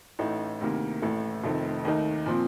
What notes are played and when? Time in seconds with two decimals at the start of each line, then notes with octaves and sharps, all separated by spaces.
0.19 A1 A2 A3 D#4
0.61 D2 C3 D#3 A#3
1.02 A1 A2 A3
1.44 F1 F2 D#3 A3 C4
1.85 D#2 D#3 A3 D#4
2.26 A#2 F3 C4